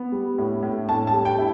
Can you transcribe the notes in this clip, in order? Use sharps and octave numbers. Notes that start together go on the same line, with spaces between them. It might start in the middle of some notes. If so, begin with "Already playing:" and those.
Already playing: B3
G3
A2
A2
A2 A5
A5
G3
G5
E4